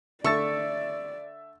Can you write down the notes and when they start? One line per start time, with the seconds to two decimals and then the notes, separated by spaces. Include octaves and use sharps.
0.24 D3 A3 D5 E5 C#6 E6 A6